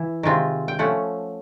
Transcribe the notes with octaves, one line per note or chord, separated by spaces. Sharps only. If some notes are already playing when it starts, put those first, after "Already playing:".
Already playing: E3 E4
C3 D#3 G#3 C4 F4
G5
F3 A3 C#4 F#5